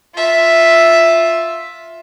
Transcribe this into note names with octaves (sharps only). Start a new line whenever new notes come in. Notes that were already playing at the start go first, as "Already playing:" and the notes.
F4 E5